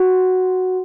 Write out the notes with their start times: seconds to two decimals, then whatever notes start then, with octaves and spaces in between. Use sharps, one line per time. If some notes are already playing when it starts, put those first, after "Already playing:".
Already playing: F#4